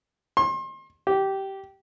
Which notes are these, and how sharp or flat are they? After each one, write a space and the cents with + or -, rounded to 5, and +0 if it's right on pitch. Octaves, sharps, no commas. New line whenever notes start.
C6 +35
G4 -15